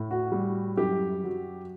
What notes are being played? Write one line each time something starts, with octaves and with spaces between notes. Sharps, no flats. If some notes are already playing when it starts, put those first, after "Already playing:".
Already playing: A2
F#4
G3
F#2 G4
F#3